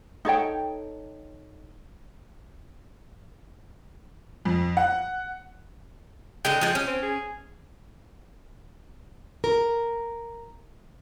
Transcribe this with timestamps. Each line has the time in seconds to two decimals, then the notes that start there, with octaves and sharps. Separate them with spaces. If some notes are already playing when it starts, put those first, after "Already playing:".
0.25 D#4 A4 C#5 G5
4.45 F2
4.77 F#5
6.45 D3 F#3 G#3 G5
6.61 F3 G#3
6.75 C#4
6.87 C4
7.02 G#4
9.44 A#4